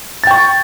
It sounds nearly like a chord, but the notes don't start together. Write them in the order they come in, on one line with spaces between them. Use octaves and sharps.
A6 G5 C#6